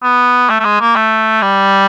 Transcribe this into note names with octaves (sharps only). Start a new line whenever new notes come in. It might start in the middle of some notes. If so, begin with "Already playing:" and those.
B3
A3
A3
G#3
A#3
A3
G3